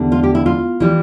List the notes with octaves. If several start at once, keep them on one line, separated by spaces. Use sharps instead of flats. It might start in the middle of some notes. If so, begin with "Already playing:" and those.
Already playing: E2 D3 G3
F4
G4
E4
F4
E3 G3